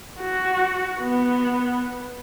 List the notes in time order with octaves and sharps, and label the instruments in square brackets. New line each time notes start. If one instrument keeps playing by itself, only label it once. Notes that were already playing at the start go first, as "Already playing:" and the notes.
[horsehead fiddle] F#4
B3